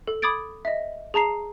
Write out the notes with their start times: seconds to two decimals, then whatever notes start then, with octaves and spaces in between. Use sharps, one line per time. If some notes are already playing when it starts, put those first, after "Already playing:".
0.07 A4
0.22 B5 D6 D#6 G#6 A6 D7
0.65 D#5 E5
1.14 G#4 A5 A#5 C7